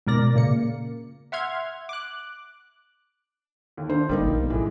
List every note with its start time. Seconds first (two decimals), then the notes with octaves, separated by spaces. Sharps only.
0.07 G#2 B2 A#4 D5 A#6
0.35 A#2 C#3 A#3 C#7
1.32 E5 F#5 C6 F6 G#6
1.89 D6 F#6
3.77 D#2
3.90 D4 C5
4.09 G1 G3 A#3 D#4
4.24 A#1
4.37 B1
4.50 A1 E3 G#3